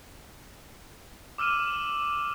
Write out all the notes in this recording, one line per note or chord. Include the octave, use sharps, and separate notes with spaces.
D6 E6 F6 D#7 E7